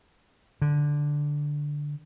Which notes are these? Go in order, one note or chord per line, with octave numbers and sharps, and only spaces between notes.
D3